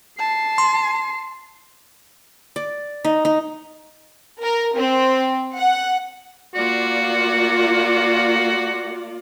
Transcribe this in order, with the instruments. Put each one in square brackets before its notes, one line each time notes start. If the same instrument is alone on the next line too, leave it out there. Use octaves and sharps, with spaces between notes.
[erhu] A5 [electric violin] C7
[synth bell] C6
[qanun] D5
D#4
D#4
[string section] A#4
C4
F#5
[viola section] A#3 F4 D5 [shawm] F#4